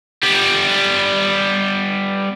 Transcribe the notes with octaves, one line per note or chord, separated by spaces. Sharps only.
G3 B3